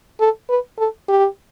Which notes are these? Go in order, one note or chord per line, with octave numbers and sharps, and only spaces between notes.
A4
B4
A4
G4